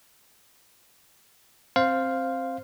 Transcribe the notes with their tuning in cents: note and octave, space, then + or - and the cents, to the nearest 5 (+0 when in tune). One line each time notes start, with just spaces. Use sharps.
C4 +20 C5 +0 F5 +0